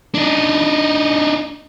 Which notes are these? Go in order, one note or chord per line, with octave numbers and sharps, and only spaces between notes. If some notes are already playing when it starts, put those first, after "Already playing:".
D4 D#4